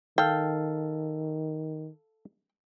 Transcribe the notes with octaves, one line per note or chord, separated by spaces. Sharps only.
D#3 A4 F5 G5